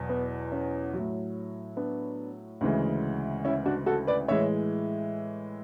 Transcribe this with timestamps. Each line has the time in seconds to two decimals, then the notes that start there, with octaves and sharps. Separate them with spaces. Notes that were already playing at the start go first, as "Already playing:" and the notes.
Already playing: E2 B2 F#3
0.09 B3
0.52 C#4
0.93 A2 F#3
1.77 B3 D4
2.61 D2 C#3 E3 G#3
3.45 C#4 E4
3.66 D4 F#4
3.86 F#4 A4
4.07 B4 D5
4.28 A2 E3 G#3 C#5 E5